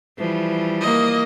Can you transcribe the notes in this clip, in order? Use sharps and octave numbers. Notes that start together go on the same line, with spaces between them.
E3 F3 G3
A#3 D#5